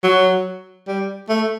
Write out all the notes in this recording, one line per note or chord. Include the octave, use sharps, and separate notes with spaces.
F#3
G3
A3